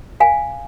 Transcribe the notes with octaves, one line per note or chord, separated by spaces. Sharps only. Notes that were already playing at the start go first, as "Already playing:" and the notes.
F5 G#5